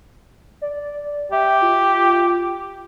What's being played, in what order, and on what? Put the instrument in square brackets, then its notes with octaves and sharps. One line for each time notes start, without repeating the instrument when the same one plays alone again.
[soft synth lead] D5
[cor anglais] G4 [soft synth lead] E5
[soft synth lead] F4